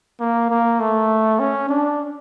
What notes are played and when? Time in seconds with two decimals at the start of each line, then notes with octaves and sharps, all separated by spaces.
0.20 A#3
0.50 A#3
0.80 A3
1.39 C#4
1.69 D4